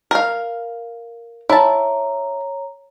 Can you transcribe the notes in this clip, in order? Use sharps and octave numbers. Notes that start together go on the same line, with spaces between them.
A#4 F5
E4 C#5 A5 A#5